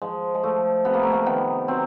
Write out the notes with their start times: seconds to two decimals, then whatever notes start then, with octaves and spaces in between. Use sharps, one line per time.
0.02 F3 G#3
0.34 G#3
0.43 F3 A3
0.85 C3 B3
0.94 A#3
1.03 A3
1.12 A#3
1.26 D#3 B3
1.68 F#3 C4